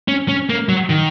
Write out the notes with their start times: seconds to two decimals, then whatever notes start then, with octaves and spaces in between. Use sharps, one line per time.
0.08 C#4
0.29 C#4
0.50 A#3
0.69 F#3
0.90 D#3